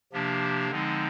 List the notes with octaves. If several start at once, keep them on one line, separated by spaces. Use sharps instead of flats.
C3 F3 A#3 D4 G4
D3 F3 G#3 C4 D#4